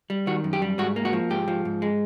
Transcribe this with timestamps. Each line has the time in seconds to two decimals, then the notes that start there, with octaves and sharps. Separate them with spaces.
0.10 G3
0.27 D#3 F#4
0.44 F#2
0.53 G4
0.62 G3
0.78 G#2 F#4
0.96 A#3
1.05 F#4
1.13 F3
1.30 G#2 G4
1.48 F3
1.65 G#2
1.82 G#3